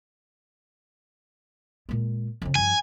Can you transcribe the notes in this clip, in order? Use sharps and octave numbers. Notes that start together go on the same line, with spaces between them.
A#2 G#3
F2 C#3
G2 F3 G#5